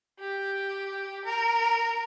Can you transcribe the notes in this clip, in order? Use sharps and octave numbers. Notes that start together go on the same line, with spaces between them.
G4
A#4